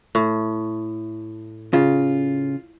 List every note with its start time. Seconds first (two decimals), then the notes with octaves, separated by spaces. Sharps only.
0.15 A2
1.73 C#3 F4